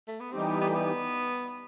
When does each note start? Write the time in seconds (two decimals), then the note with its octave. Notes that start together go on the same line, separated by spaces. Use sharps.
0.07 A3
0.21 B3
0.32 E3 G3 C4 D#4 G4
0.47 B3
0.61 B3
0.68 A3
0.75 B3